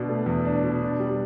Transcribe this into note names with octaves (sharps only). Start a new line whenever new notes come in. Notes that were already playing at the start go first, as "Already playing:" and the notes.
Already playing: B2 D4
A3
E2
D4
B2
D4
G3